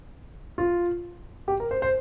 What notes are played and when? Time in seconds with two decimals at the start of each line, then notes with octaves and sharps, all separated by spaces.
0.58 F4
1.48 G4
1.60 A#4
1.71 C5
1.82 C5